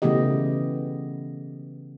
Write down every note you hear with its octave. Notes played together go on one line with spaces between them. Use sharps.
C#3 E3 A3 B3 G4 D#5